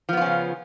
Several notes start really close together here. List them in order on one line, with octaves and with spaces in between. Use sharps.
F3 B3 F4 C#4 C#3